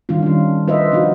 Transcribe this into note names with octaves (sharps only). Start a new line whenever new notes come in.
D#3 G3 D4 F4
C#4 D4
F4 B4 C5 D#5 E5
F3 D4 D#4 F4 F#4